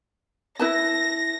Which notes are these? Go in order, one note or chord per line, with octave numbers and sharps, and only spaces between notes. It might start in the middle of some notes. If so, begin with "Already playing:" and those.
E4 B4 A5 A#6